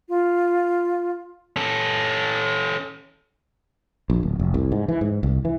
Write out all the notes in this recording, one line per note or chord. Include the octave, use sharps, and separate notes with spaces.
F4
C#4 A4
A#1
D1
F1
C2
G#2
E3
G#2
C2
E3